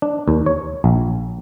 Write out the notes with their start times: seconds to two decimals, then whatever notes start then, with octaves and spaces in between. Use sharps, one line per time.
0.02 D4
0.28 D#2
0.46 C#5
0.84 A#1